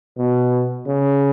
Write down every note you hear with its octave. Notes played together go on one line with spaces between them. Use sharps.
B2
C#3